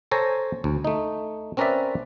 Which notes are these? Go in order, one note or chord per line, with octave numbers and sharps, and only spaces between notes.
A4 C5 C#5 G#5 A#5
D2
A3 D#4
C4 C#4 A#4 B4 D5 E5